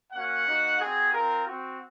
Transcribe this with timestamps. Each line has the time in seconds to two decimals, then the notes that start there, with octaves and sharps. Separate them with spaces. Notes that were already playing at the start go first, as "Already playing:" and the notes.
0.13 A#3 C#4 F#4 F#5
0.47 A#3 D#4 F#4
0.79 C4 F#4 G#4
1.13 C4 F4 A#4
1.46 C4 F#4